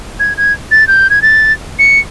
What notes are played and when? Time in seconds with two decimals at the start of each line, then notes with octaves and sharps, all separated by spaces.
0.20 G#6
0.37 G#6
0.71 A6
0.88 G6
1.10 G#6
1.22 A6
1.79 C#7